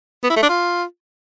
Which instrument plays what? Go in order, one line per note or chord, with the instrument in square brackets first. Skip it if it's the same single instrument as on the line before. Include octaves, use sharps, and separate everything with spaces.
[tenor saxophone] B3
E4
A3
D4
F4